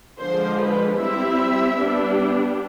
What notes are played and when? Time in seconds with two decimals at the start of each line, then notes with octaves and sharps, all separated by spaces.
0.21 D3 F3 G#3 C5
0.60 B4
1.00 G3 C4 E4 E5
1.78 G3 B3 D4